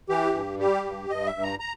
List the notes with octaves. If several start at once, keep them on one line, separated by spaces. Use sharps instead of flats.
E3 G4
G2
G3 G4
G2
G2 D#5
E5
G2
A#5
A#5